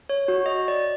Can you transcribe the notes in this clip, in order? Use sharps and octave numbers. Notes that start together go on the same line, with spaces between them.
C#5
F#4
D#5
D5